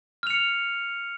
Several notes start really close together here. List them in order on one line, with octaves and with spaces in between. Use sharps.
F6 F7 C#7